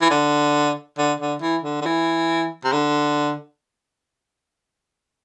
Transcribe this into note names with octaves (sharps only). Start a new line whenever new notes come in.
E3
D3
D3
D3
E3
D3
D3
E3
C3
D3